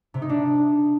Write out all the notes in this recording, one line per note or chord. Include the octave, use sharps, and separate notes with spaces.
C3
D#4
D4